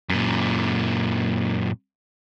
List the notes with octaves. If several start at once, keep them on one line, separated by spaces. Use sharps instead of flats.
F#2 A#2